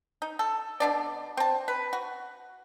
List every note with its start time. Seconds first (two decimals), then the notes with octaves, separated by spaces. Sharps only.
0.22 D#4
0.39 A4
0.80 B2 D4 D5
1.37 C4 A5
1.68 B4
1.93 F#4